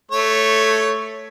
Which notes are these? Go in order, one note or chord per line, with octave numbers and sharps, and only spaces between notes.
A3 C#5